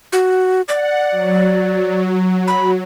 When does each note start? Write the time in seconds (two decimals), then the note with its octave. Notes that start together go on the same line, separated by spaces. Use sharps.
0.13 F#4
0.68 D5 F#5
1.11 F#3
2.48 B5